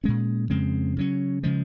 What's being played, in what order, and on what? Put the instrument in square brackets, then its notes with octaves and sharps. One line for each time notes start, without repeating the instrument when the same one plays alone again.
[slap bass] A#2 G#3 C#4
F2 C#3 G#3 C4
C#3 F#3 C#4
C#3 F3 G#3